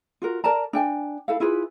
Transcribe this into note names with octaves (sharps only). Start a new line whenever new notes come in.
F4 F#4 A#4
A#4 D5 A5 A#5
D4 G5 G#5
E4 A4 F5
E4 F4 G#4 B4